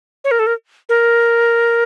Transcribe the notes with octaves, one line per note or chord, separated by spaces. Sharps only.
C#5
A#4
A4
A#4
A#4